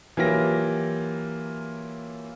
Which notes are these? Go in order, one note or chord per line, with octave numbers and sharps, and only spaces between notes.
E3 F#3 A#3 F4 G4 A#6